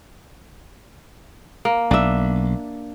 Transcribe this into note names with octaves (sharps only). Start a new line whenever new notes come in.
A#3
B1 D4 E5